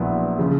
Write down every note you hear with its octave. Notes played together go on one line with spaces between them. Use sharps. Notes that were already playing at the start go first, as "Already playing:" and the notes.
Already playing: A#1 A#2 F#3 B3 E4
C#3 F3